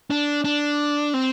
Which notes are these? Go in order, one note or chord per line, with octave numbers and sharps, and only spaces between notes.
D4
D4
C4